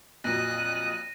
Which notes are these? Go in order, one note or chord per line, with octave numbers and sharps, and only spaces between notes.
F2 A#2 F#3 D#5 F#6 A#6 D#7